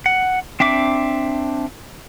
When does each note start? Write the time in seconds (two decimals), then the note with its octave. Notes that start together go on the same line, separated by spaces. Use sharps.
0.06 F#5
0.60 C4 D4 E5 D6